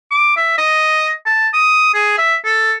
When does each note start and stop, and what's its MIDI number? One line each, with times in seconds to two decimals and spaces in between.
0.11 0.34 86
0.37 0.54 76
0.58 1.10 75
1.26 1.49 81
1.53 1.92 87
1.94 2.14 68
2.18 2.36 76
2.45 2.73 69